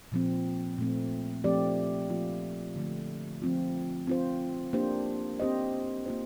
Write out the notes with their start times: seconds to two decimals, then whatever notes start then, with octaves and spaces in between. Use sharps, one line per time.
0.12 A#2 F3 C4
0.78 A#2 A3 C4
1.44 F3 A3 C4 G4 D5
2.10 F3 A#3 F4
2.75 D3 F3 A3
3.42 F3 C4 F4
4.07 C4 F4 C5
4.73 A#3 D4 G4 C5
5.40 C4 G4 C5 D#5
6.06 A#3 F4 C5